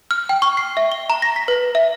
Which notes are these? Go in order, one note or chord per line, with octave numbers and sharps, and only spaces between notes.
F6
G5
C#6
C7
E5
G7
A#5
A#6
B6
B4
E5